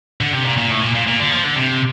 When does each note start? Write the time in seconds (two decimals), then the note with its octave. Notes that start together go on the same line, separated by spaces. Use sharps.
0.21 D3
0.33 C3
0.46 A#2
0.58 A#2
0.70 A2
0.82 A#2
0.95 A#2
1.07 A#2
1.20 D3
1.31 F3
1.44 D3
1.55 C3